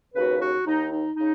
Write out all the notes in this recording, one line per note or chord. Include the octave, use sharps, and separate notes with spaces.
D#2 C#3 F#4 B4
F#4
D#2 D#3 D#4
D#4
C#3 D#4